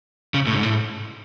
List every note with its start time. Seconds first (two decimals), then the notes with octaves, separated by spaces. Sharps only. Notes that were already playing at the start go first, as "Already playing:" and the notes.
0.34 C#3
0.47 A2
0.55 G#2
0.63 A2